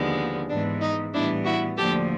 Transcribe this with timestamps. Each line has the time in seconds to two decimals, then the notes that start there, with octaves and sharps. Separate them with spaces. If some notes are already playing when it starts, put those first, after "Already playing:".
Already playing: D#2 D3 F3 G#3 B3
0.49 G#2 E3 G#3 B3 D4
0.81 D#4
1.13 A2 E3 G3 B3 D4 E4
1.45 E4 F#4
1.77 D2 D3 F3 A#3 G4 A4